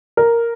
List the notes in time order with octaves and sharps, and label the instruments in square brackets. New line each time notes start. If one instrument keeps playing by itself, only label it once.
[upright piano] A#4